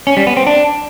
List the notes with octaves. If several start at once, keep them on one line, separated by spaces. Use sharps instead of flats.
C#4
G3
B3
C4
D4